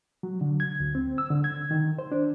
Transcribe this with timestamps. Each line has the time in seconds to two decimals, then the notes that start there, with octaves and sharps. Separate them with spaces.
0.23 F#3
0.41 D3
0.60 G#6
0.80 D2
0.95 C4
1.18 E6
1.30 D3
1.44 G#6
1.71 D#3
1.99 C5
2.12 D4